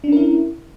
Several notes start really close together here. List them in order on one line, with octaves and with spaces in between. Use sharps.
D4 C#4 A#4 E4